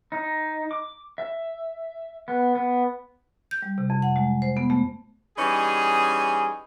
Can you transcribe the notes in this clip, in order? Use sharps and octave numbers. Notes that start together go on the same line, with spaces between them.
D#4
D6
E5
B3
B3
G6
G3
C3
F2
F#5
G#3
C5
B3
A3
E3 G3 C#4 D#4 G#4